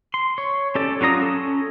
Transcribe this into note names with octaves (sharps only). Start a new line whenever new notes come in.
C6
C#5
C#4 G4 A4 D5
F#3 C#4 F4 A#5 D#6
C#4 A4